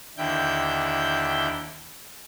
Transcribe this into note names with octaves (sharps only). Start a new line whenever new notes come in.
D#2 D3 E4 G5 G6